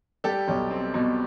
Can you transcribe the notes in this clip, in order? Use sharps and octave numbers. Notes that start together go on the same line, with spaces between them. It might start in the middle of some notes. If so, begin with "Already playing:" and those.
G3 G4 A4
B1
C4
B2